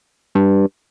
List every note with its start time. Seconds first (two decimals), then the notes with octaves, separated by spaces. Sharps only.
0.35 G2